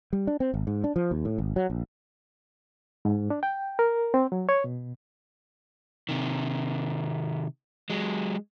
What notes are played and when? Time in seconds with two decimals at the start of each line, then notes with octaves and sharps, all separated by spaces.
0.13 G3
0.27 D4
0.40 C4
0.54 G#1
0.67 G#2
0.84 D4
0.96 F3
1.11 D#2
1.25 A2
1.38 G#1
1.56 F#3
1.70 A#1
3.05 G#2
3.30 D4
3.43 G5
3.79 A#4
4.14 C4
4.32 F#3
4.49 C#5
4.64 B2
6.09 C3 D#3
7.90 F#3 G#3